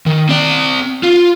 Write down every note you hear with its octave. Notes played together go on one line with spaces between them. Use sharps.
D#3
C4 D5
F4